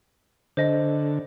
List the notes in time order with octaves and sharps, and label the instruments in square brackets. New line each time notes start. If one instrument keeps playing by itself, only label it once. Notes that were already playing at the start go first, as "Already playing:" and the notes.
[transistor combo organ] D3 [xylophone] C5 D#5